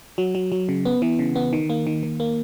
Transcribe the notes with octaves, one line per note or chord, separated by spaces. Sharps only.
F#3
F#3
F#3
C#3
B3
E3
C#3
B3
D#3
A#3
D#3
D#3
A#3